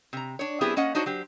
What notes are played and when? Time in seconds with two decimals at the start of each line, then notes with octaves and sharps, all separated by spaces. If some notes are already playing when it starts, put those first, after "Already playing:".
0.13 C3 A#5
0.39 D4 C#5
0.61 F#3 B3 C4 E4 G4 G#4
0.76 A#3 C#4 D#5 F#5
0.95 D4 D#4 F#4 C5 C#5
1.06 F#3 G4 C5